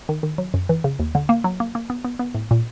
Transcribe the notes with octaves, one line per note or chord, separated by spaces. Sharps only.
D#3
D#3
F#3
F#2
E3
C#3
D#2
D3
A#3
F#3
A#3
A#3
B3
B3
B3
A2
A#2